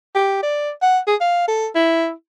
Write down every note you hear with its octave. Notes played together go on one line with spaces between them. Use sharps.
G4
D5
F#5
G#4
F5
A4
E4